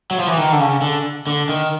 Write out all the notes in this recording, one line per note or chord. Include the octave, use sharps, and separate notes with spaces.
F#3
F3
E3
D#3
D3
C#3
D3
D3
D#3